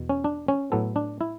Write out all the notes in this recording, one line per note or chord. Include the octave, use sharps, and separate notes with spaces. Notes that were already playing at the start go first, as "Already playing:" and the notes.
Already playing: E2 B2
C#4
D4
C#4
A2 F#3 B3 A4
D4
E4